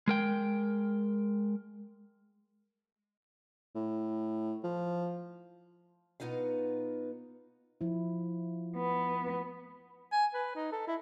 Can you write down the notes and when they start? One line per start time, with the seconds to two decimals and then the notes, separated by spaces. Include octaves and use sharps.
0.08 G#3 A#4 G5
3.75 A2
4.64 F3
6.20 B2 B3 D#4 F4 F5
7.81 F3 E4
8.77 B3
10.12 G#5
10.34 B4
10.56 D#4
10.72 A4
10.88 E4